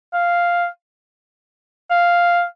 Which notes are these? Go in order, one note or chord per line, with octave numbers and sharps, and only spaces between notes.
F5
F5